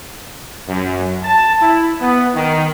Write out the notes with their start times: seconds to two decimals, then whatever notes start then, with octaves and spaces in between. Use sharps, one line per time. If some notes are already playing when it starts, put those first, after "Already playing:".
0.68 F#2
1.23 A5
1.61 E4
2.00 B3
2.35 D#3